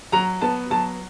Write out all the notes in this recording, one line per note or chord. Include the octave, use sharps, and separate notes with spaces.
F#3 A#5
B3 A5
F#3 A5